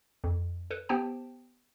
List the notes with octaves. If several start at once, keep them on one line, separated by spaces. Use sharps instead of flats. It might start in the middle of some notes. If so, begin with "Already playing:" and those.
F2
A4 B4
B3 G4 C5 G5 A5